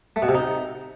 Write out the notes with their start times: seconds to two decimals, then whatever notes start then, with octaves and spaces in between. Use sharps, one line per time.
0.16 A3
0.22 B2
0.28 C3
0.35 D#4